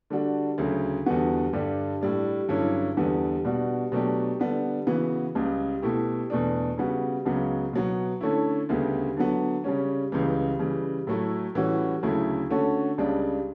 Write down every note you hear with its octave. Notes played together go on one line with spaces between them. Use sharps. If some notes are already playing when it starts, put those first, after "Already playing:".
D3 G3 D4 F#4
D2 C#3 F#3
E2 D3 G3 B3 F#4
G2 D3 G3 D4 G4
A2 G3 D4
G2 D3 F#3 C#4 E4
E2 D3 G3 B3
B2 G3 D4 F#4
B2 F#3 A3 D4 G4
D3 G3 B3 D4
C#3 E3 B3 F#4
C#2 C#3 G3
B2 A3 E4 G4
E2 B2 A3 D4
C#3 G3 B3 F#4
C#2 C#3 F#3 B3
B2 F#3 B3
D3 A3 C#4 E4
D2 C#3 G3 B3
D3 F#3 B3
C#3 G3 C#4
C#2 C#3 E3 G3
C#3 E3 G3
A2 F#3 A3 E4
A2 E3 G3 C#4 F#4
D2 C#3 F#3 A3 E4
D3 A3 C#4 F#4
C#2 C#3 G3 D4